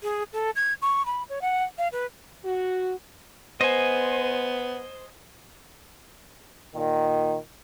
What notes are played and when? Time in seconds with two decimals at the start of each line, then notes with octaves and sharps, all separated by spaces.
0.03 G#4
0.33 A4
0.56 G#6
0.82 C#6
1.06 B5
1.29 C#5
1.42 F#5
1.78 F5
1.92 B4
2.45 F#4
3.61 B3 C5 D#5 G#5
6.75 A#2 D#3